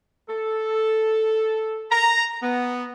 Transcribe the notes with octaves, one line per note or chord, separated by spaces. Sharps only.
A4
A#5
B3